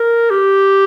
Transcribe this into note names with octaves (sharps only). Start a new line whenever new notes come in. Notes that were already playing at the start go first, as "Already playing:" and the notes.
Already playing: A#4
G4